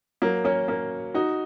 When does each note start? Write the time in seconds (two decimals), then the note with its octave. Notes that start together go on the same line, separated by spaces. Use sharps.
0.22 F#3 A#3
0.44 A#3 C#4
0.68 A#3 C#4
1.14 D#4 F#4